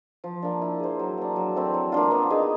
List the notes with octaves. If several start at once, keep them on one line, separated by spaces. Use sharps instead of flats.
F3
A#3 D4
E4
G#4 C5
F#3
A#3 D4
F#3
A3 C4 E4
F#3
A#3 D4 F4
B3
D#4 G#4